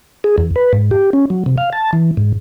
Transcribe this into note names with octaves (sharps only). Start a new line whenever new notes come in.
G#4
E2
B4
G#2
G4
C#4
F#3
C3
F5
A5
E3
G#2